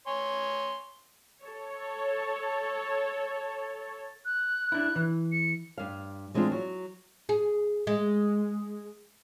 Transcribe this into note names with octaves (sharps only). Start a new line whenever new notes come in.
C#5 G#5 C6
A4 C#5
F#6
D4 E4
E3
C#7
G2 F5
E3 G#3 C4 D4 F4
F#3
G#4
G#3